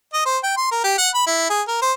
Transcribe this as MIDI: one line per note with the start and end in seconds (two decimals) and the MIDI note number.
0.14 0.25 75
0.26 0.38 72
0.43 0.57 79
0.57 0.69 84
0.71 0.81 70
0.84 0.97 67
0.98 1.09 78
1.14 1.27 83
1.27 1.48 64
1.50 1.62 68
1.68 1.79 70
1.82 1.92 72